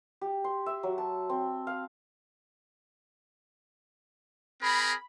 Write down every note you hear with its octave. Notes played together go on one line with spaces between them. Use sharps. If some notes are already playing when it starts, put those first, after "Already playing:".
G4
C6
E5
F#3
A5
C4
F5
C4 G#4 A#4 B5